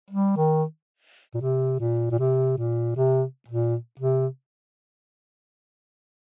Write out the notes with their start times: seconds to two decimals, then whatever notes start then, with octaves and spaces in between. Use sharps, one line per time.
0.11 G3
0.37 D#3
1.34 A#2
1.41 C3
1.80 A#2
2.11 A#2
2.19 C3
2.57 A#2
2.96 C3
3.48 A#2
4.00 C3